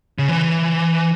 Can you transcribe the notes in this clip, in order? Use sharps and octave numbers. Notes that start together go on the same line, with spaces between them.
C#3
E3